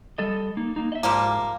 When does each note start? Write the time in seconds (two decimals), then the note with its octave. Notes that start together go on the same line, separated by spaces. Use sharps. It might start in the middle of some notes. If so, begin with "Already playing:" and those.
0.18 G3 A4 D#5
0.57 A#3 D#4
0.76 A#3 D#4
0.92 D#5 E5
1.03 G#2 F3 G3 A#3